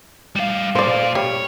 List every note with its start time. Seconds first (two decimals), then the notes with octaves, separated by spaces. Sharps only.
0.36 G3 F5
0.75 A#2 C5 D5 F5
1.15 G3 C#5